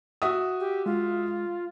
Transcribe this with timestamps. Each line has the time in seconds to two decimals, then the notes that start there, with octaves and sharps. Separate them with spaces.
0.22 F#4 E5 D#6
0.60 G4
0.86 G#3 F4